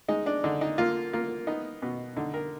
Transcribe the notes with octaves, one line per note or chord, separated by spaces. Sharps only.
G#3 D#4
D4
D3 D#4
D#4
A#3 F4
A#3 F4
B3 D#4
B2
D3 D#4
A#4